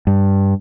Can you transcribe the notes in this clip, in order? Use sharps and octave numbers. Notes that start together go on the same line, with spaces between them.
G2